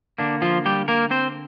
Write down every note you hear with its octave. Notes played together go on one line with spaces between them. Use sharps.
D3 A#3 D4
F3 F4
G3 G4
A#3 A#4
C4 C5